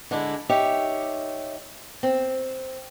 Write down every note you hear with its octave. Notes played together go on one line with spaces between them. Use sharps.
D3 G#3 D4 E4
D#4 G4 C#5 E5
C4